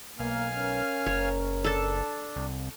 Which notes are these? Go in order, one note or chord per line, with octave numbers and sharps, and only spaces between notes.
B1 A#3 F5 G#5 F6
C#4 A#4
F#1 C#5
D4 A4 A5
C2